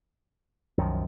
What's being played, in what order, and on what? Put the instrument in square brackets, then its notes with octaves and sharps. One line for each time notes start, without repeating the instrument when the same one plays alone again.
[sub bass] C2 [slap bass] F#2 D#3 F3